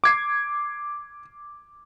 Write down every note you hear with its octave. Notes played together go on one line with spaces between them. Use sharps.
D6 G#6 C7